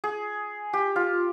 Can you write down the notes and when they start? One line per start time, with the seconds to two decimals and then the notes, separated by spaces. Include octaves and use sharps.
0.04 G#4
0.73 G4
0.96 F4